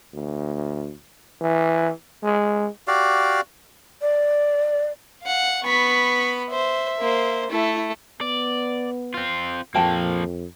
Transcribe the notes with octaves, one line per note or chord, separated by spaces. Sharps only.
D2
E3
G#3
F#4 G4 D5 F5
D5
F5 F#5
B3 B5 C#6 B6
C5 E5
A#3 C5
A3 E4 A4
B3 D5
C4 F4
F2 F3 A#3 C5 G5 A5